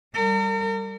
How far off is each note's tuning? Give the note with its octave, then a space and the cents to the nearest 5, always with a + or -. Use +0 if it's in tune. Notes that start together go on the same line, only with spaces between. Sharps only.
G3 +0 A#4 -40